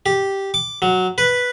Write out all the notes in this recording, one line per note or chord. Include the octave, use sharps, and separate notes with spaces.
G4
D6
F#3
B4